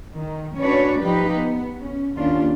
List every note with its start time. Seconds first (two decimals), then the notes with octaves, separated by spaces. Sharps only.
0.15 D#3
0.59 C#4 D4 F#4 B4 C#5 D5
1.02 F3 G3 D#4 G4 B4
1.33 B3
1.81 C#4
2.18 D#2 C#4 D4 F4